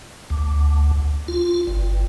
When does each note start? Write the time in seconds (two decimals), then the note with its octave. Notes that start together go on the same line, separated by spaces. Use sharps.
0.30 D2
1.28 F4
1.67 G1